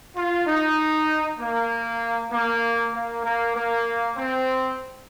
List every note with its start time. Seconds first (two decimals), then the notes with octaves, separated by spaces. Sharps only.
0.16 F4
0.47 D#4
1.40 A#3
2.32 A#3
2.94 A#3
3.25 A#3
3.56 A#3
4.17 C4